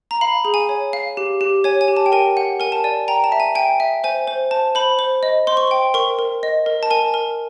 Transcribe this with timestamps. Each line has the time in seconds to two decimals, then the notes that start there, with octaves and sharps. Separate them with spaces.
0.11 A#5
0.21 F5 B5
0.45 G#4
0.54 G#5
0.69 C#5
0.93 F5
1.17 G4
1.41 G4
1.64 C#5 G#5
1.81 G#5
1.88 G4
1.97 A5
2.06 G5
2.12 A#4 G#5
2.37 F#5
2.60 A#4 G#5
2.72 A5
2.84 D5 G#5
3.08 G5 A#5
3.24 A5
3.32 E5
3.40 G#5
3.55 G5 G#5
3.80 E5
4.04 C5 G#5
4.27 C5
4.51 C5 A5
4.75 C5 B5
4.99 C5
5.23 D#5
5.47 C5 C6
5.57 C#6
5.67 G5 C6
5.94 A#4 C#6
6.19 A#4
6.43 D#5
6.66 A#4
6.83 A5
6.90 A#4 G#5
7.14 A#4